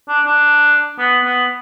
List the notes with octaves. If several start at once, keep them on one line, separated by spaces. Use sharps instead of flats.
D4
D4
B3
B3